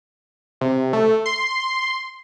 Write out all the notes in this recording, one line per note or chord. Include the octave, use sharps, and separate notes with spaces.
C3
A3
C6